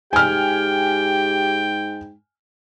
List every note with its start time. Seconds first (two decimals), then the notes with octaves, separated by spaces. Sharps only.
0.13 G#2 G4 G5 G#5 F6